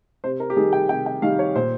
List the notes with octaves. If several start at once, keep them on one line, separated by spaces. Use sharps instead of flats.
C3 C5
A#4
G4
D#3 G3 G#4
G5
C3 G5
G5
D#3 G3 F5
C#5
A#2 C5